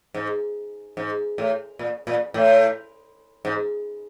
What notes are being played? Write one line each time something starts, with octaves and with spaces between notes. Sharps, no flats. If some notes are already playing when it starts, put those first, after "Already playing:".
G#2
G#2
A2
A#2
A#2
A2
G#2